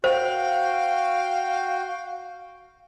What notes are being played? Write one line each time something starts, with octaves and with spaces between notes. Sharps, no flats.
F#4 C5 F5 G5